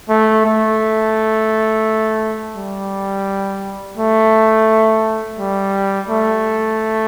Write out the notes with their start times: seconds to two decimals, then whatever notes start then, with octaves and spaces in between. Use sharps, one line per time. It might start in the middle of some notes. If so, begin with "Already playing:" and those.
0.09 A3
0.45 A3
2.56 G3
3.97 A3
5.39 G3
6.09 A3